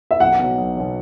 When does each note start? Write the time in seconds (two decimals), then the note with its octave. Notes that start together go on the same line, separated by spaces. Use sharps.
0.11 E5
0.20 B1 F#5
0.39 B2 F#3
0.58 B1
0.77 B2 F#3